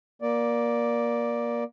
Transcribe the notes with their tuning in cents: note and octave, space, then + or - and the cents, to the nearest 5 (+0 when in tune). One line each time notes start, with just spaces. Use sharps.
A#3 +25 D5 +0